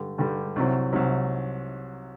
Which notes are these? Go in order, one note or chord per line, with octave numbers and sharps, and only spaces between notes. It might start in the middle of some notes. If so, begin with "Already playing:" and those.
Already playing: G2 D3 G3
G2 D3 G3
C2 C3 F#3
C2 C3 F#3